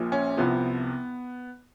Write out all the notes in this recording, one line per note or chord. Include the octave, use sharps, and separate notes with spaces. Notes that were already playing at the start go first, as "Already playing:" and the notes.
Already playing: A#1 A#2 F3
C#4
C2 C3 F3 B3